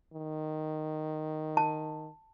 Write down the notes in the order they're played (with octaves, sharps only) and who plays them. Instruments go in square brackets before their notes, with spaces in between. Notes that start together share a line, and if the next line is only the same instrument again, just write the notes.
[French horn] D#3
[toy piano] A5